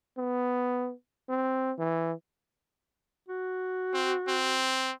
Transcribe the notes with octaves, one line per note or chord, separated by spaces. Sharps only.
B3
C4
E3
F#4
C4
C4